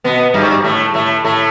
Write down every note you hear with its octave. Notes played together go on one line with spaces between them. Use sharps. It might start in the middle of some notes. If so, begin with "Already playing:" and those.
B2 B3
G2 G3
A2 A3
A2 A3
A2 A3